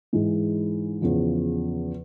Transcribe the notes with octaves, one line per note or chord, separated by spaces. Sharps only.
G#2 E3 G#3
E2 C#3 F3